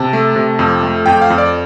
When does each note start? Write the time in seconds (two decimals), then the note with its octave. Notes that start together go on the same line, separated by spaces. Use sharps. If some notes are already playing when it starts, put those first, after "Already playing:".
Already playing: C3 A5
0.13 A3
0.36 C3
0.59 F2
0.83 A3
1.06 F2 G5
1.21 F5
1.30 F2
1.38 D5